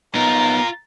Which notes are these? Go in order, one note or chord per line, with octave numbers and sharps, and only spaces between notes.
B3 D#4 F4 A#4 A#5